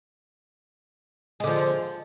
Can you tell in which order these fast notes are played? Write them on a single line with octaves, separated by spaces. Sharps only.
G#3 D3 F3